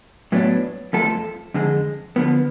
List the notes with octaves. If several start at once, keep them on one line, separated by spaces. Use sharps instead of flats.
A2 F#3 B3 D4
F2 F3 A3 F4 A4
F2 D3 G#3
D3 F3 B3